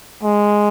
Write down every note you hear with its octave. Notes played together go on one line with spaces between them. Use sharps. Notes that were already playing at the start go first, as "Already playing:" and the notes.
G#3